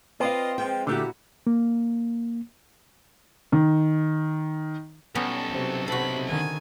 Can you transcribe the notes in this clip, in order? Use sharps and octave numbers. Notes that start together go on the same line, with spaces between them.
C4 F4 B4 D5 D#5 F5
F3 G#3 G5
A#2 D3 A3 E4 F#4 G4
A#3
D#3
B1 G3 B3 C#4 A4
C3 F#3
C3 F#4 A4 B5
D3 D#3 G#5